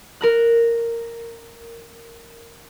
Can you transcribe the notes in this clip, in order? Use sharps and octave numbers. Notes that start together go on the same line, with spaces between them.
A#4 A#5 F#6